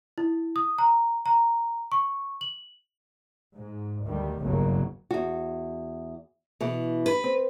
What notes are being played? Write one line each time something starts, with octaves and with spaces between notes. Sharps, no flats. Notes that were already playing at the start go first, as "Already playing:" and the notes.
E4
D#6
A#5
A#5
C#6
F#7
G#2
D2 D#3 G3
F#1 B1 G2 C#3 F#3 A#3
E2 F#4
B2 E3
B4
C4